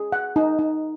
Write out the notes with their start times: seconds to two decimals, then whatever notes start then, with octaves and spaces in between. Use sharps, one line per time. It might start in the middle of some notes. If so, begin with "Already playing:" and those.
Already playing: G#4
0.12 F#5
0.36 D#4
0.59 D#4